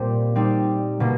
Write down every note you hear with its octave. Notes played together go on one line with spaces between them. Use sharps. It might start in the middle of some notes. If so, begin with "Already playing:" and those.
Already playing: A#2 G3 A#3 C4
G3 C4 D#4
B2 G3 A#3